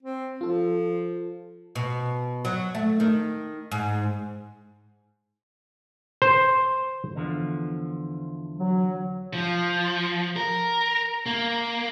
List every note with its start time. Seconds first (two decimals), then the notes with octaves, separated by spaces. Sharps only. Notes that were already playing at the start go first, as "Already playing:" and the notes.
0.03 C4
0.41 F3 F4 A4
1.76 B2
2.45 F#3
2.75 A3
3.00 D#3
3.72 G#2
6.22 C5
7.15 E2 D3 F3
8.58 F#3
9.33 F3
10.36 A#4
11.26 A#3